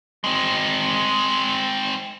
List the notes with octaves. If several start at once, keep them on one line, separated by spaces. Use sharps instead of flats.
G#3 C4